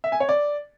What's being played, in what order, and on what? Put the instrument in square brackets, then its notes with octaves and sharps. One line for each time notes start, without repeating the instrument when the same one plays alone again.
[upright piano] E5
G#5
C#5
D5